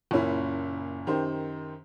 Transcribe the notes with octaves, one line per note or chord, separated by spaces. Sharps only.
F#1 A#2 C#4 E4
F#2 D#3 G4 C5